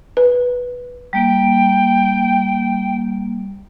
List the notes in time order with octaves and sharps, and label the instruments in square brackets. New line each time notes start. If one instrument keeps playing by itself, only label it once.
[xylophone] B4
[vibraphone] G3 A#3 [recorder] G5